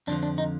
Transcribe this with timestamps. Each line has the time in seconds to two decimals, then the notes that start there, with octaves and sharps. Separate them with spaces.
0.07 F2 D3 F3 D4
0.23 D4
0.38 D#4